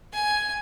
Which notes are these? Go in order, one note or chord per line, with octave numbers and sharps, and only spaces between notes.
G#5